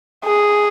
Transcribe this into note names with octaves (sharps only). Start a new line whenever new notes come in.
G#4